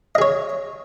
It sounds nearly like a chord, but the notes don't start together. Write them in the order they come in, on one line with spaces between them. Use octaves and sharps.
D#5 G#4 C#5